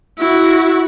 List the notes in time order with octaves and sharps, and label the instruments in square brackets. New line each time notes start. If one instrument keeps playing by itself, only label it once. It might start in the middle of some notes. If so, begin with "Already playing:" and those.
[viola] E4 F#4